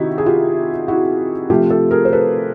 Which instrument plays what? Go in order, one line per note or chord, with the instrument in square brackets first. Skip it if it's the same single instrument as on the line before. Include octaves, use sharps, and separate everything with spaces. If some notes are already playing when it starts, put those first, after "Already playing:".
Already playing: [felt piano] C3 D#3 D#4 E4 F#4 G4
G#4
F4 G4
E4 F#4
C3 F3 A3 F4 G4
G4 A4
G#4 A#4
C5
A4 B4